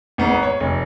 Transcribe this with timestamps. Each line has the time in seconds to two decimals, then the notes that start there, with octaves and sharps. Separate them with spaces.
0.18 G#1 B3 A#5
0.43 C#5
0.60 F1